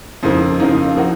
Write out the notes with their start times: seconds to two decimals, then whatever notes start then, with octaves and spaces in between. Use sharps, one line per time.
0.23 F2 C#3 F3 A#3 D#4
0.60 F2 C#3 F3 A#3 D#4
0.97 F3 A#3 D#4 F#4